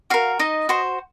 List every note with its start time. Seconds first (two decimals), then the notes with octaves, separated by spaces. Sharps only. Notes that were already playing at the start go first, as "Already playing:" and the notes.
0.10 F#4 A#4 F5
0.39 D#4 D#5
0.69 F#4 C5